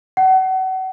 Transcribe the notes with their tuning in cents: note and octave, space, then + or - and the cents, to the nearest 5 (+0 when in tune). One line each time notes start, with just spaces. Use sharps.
F#5 +30